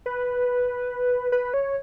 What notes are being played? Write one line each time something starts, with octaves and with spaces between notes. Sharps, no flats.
B4
B4
C#5